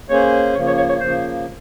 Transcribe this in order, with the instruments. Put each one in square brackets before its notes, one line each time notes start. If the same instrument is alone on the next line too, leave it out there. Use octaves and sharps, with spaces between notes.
[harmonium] A#3 C#4 G#4 C5 [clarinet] C#5
[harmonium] C#3 F3 A#3 [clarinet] C#5
[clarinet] C#5
C#5
C#5
[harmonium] C#3 F3 A#3 [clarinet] C5